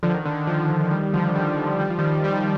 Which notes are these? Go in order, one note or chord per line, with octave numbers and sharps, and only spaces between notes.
D3 F3
D#3
D3
D#3
D3 F3
D#3 G3
D3 F3
D#3 G3
G3
F3
D#3 G3
D#3 G3